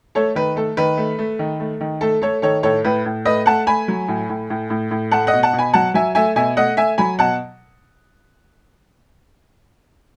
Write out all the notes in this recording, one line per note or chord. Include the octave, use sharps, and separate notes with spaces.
A3 A4 C#5
D#3 B4
A3 A4
D#3 B4
A3
A3
D#3
A3
D#3
A3 A4
A3 A4 C#5
D#3 A4 C#5
A2 A4 C#5
A2 B4
A2
A3 B4 D#5
A3 F#5 A5
A3 G#5 B5
F#3
A2
A2
A2
A2
A2
A3 F#5 A5
D#5 F#5
B2
F#5 A5
B2
G#5 B5
F#3 F#5 A5
F#3 E5 G#5
A3 E5 G#5
B2 E5 G#5
A3 D#5 F#5
A3 E5 G#5
F#3 G#5 B5
B2 F#5 A5